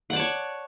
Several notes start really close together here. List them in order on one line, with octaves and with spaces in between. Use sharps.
F#5 D5 A5 C#5